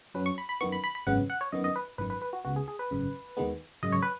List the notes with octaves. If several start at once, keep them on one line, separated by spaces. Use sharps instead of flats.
F#2 F#3 C#4 B4
C#6
B5
B5
F#2 D#3 B3 C#6
B5
B5
B5
G#1 F#2 C#3 B3 F#5
F#5
C#5
F#2 D#3 B3 D#5
D#5
B4
G#1 F#2 D#3 B4
B4
B4
F#4
C#2 C#3 B3 F#4
G#4
G#4
B4
G#1 F#2 C#3
D#2 D#3 G#3 B3
G#1 F#2 C#3 D#5
C#5
B4